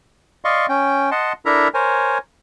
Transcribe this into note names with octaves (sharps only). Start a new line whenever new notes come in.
D5 D#5 F5 C6 C#6
C#4 G5
D#5 F#5 A5 C6
D4 E4 A4 A#4 E5 A#5
A#4 C5 C#5 G#5